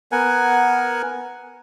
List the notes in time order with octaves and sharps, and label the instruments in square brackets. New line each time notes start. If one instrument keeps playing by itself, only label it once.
[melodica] B3 A#4 F#5 G#5